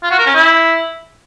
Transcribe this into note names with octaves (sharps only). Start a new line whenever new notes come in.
F4
F#4
A#4
C#4
E4